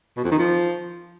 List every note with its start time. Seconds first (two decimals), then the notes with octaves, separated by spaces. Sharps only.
0.17 B2
0.24 F2
0.31 D#3
0.39 F3